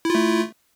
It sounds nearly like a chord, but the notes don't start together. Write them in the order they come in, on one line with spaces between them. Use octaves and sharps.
E4 F4 A3